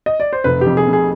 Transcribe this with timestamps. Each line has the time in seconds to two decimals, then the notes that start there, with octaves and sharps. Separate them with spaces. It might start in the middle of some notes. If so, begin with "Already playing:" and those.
0.06 D#5
0.20 D5
0.33 C5
0.44 F1 B4
0.61 F2 G4
0.77 G#4
0.87 C3
0.93 G#4